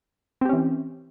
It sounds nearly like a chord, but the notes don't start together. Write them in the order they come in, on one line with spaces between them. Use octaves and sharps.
C4 G4 C#4 E3